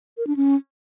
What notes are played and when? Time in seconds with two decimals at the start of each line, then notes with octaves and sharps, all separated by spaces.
0.17 A#4
0.27 D4
0.36 C#4